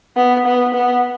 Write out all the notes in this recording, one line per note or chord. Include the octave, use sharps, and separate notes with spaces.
B3
B3
B3